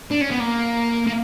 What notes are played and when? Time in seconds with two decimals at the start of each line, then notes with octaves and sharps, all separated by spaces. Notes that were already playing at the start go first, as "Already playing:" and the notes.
0.11 D4
0.21 C#4
0.30 B3
0.40 A#3
1.07 A#3